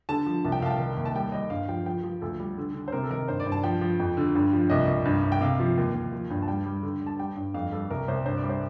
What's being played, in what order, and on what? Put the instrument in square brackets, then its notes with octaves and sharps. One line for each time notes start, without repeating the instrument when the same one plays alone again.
[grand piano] D3 A5
F3
C2 A5
G5
C2 F5 A5
G5
D#3
D#2
A5
G3 G5
G3 D#5
G2 F5
F3 G5
F3 G5
F3
D2 A4
G3
D3
D3
C5
C3 A#4
A4
D#3 A#4
G2 C5
D5
G2
A5
F3 G5
F3
F2
D3
G2
F3
C2 D#5
C2
G2
G2
G5
C3 F5
F3
D#2
D#2
F3
G2
A5
G3 G5
G3
D3
G3
A5
G3 G5
G2
F2 F5
G3 A4
C2 A#4
C2 C5
G2 C5
D5
G3
C5